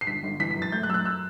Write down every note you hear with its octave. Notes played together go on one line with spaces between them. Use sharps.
C7
G1 B6
G1
E3 B6
B6
F#2
A6
A3 G6
F#6
F#2 E6
F#6
E6